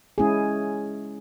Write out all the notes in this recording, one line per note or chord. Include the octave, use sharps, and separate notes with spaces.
G#3 C#4 E4 G#4